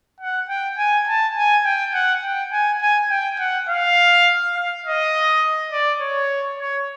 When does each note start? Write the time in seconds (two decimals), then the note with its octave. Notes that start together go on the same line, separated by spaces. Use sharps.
0.20 F#5
0.49 G5
0.78 G#5
1.08 A5
1.36 G#5
1.65 G5
1.94 F#5
2.23 G5
2.52 G#5
2.81 G#5
3.10 G5
3.39 F#5
3.69 F5
4.55 F5
4.85 D#5
5.72 D5
6.01 C#5
6.59 C#5